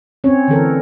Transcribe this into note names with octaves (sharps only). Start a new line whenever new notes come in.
C4 C#4 C#5
D3 E3 A4 A#4